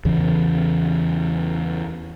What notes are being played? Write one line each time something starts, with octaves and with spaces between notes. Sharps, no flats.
E2 C#3 E3